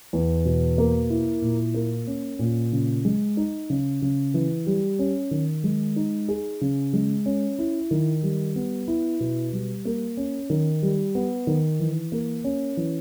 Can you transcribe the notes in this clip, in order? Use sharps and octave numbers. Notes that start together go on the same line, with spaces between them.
E2
B2
A#3
E4
A#2
A#3
C#4
A#2
C#3
G#3
D#4
C#3
C#3
E3
G3
C#4
D#3
G#3
D#4
G#4
C#3
G#3
C#4
E4
D#3
G3
B3
E4
B2
G3
A#3
C#4
D#3
G3
B3
D#3
E3
A#3
C#4
E3